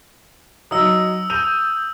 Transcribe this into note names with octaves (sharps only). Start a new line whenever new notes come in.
F#3 D#4 D#6 E6
G6 D#7 F7